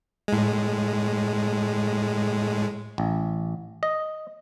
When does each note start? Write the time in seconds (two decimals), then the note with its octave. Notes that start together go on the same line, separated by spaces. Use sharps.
0.28 A2 G#3
2.98 A1
3.83 D#5